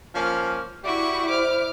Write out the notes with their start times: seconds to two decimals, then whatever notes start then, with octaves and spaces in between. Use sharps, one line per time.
0.15 F3 A#3 C#4
0.84 E4 F#4 G4 D5 C#6
1.29 C5 D6 F6